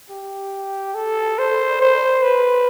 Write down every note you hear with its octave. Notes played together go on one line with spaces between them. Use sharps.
G4
A4
C5
C5
B4